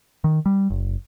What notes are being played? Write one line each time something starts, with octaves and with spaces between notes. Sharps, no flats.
D#3
G3
F#1